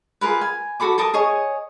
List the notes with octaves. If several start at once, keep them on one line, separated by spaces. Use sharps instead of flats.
F4 G#4 A#4 B4
G#5
F#4 A4 B5 D6
A4 A#4 A5 D#6
G#4 C#5 D#5 C#6